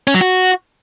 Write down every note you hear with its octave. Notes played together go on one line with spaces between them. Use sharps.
C#4
F#3
F#4